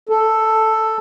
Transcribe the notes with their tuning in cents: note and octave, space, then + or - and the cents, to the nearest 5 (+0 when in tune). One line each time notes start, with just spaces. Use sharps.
A4 +5